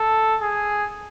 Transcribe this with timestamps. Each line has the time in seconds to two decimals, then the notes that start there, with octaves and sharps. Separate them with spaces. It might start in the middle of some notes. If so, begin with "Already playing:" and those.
Already playing: A4
0.41 G#4